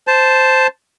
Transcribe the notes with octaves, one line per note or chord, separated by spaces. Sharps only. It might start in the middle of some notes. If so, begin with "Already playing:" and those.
C5 A5